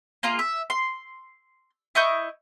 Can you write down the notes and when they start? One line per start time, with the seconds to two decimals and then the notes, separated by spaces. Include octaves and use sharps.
0.23 A#3 F4 G#4
0.39 E5
0.70 C6
1.95 E4 D#5 C#6 G6